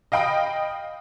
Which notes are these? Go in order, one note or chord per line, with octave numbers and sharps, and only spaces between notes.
D#5 F5 G5 B5 D#6